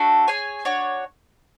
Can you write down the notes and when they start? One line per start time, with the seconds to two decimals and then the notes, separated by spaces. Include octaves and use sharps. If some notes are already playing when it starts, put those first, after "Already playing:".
Already playing: A3 D4 F#4 A4
0.27 G#4 C#5 G#5
0.65 D4 F#4 C#5